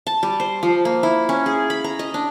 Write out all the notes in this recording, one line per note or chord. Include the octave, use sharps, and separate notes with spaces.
A5
G3
C5
F3
A#3
E4
C#4
G#4
B5
A#5
D#5
D4